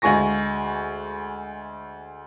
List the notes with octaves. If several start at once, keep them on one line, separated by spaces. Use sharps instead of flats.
D2 G#3 G#5 C#6 A#6